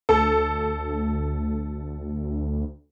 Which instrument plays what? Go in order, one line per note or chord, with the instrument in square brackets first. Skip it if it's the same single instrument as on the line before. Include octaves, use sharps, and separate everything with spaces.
[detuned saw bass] D2 [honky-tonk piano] A4